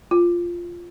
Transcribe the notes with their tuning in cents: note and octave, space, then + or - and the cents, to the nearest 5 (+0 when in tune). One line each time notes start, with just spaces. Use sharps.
F4 -5